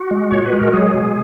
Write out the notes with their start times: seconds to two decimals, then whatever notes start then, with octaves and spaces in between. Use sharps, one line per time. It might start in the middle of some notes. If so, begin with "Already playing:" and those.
Already playing: F#4
0.11 G#3
0.31 A#2 C#5
0.45 B4
0.53 G#3
0.59 A#4
0.73 F#3 G#3 G#4
0.94 B2